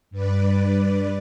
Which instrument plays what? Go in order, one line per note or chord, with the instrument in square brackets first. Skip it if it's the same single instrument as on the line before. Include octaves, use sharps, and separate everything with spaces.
[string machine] G2 B4 D5